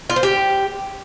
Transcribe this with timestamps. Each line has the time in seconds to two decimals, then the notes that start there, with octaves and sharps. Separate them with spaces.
0.10 F4
0.16 C5
0.23 G4